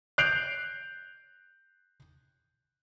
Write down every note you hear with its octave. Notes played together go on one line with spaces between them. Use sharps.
F#6 G6 C7 D7 F7